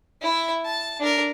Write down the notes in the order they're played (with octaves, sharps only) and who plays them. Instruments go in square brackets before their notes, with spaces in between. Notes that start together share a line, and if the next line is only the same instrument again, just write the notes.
[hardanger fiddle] E4 E5
A5
D4 A#4